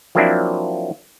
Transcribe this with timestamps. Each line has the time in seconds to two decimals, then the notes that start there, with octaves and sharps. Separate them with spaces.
0.15 F3 F#3 A#3 C4 D4 E4